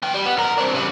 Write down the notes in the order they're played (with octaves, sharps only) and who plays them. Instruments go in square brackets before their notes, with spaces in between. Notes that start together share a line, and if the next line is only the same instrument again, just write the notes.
[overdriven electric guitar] E3 G5
G3
B3
G2 A#4
C4 D4
C#3 G3